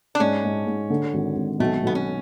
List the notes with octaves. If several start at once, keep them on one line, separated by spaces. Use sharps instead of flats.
D4
G#2 C#4
G#2
G#2
D3
G#1
G#1
B1 A3
B1 B3
C#4